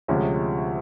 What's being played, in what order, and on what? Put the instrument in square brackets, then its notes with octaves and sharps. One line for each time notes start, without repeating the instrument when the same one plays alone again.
[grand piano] D2 C3 F3 G#3 C#4